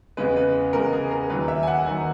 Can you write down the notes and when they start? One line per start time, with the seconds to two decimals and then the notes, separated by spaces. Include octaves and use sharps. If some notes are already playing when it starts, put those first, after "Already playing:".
0.17 E2 C#3 G#3 B4
0.36 B4
0.73 E2 C#3 G#3 A#4
0.93 G#4
1.11 A#4
1.30 D#2 D#3 F#3 B4
1.48 E5
1.63 G#5
1.67 F#5
1.86 D#2 D#3 F#3 G#5